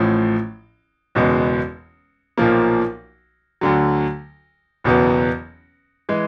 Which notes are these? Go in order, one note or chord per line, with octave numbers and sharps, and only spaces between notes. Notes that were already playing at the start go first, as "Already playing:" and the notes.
Already playing: A1 A2 F3
F#1 E2 B2 G#3 B3
B1 A#2 F3 A#3
D2 D3 F#3
F#1 E2 B2 F#3 B3
E3 G#3